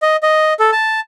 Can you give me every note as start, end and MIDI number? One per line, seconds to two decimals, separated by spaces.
0.02 0.16 75
0.23 0.53 75
0.60 0.71 69
0.72 1.00 81